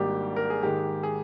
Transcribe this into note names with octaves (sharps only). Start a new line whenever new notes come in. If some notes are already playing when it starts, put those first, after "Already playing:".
Already playing: G#1 G#2 G3 A#3 D4 G4
A#4
G#4
G#2 D#3 G#3 G4
G#4